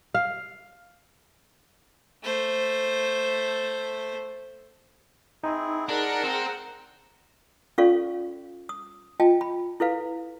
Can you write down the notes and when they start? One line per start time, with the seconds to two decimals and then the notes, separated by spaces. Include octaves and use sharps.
0.14 F5
2.23 A3 C5
5.44 C4 D#4 E4 G#4
5.89 D4 G#4 A#4 F#5 A#5
6.24 C4
7.78 C#4 F4 A4 D5 F5 C#6
8.69 D#6
9.20 F4 D#5 G5 A5
9.41 B5
9.80 E4 A4 B4 F5